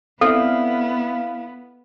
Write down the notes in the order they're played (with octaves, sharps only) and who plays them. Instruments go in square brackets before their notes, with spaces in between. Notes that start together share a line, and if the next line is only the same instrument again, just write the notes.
[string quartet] B3 [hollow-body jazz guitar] C4 D4 E4 [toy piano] A4 [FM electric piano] F5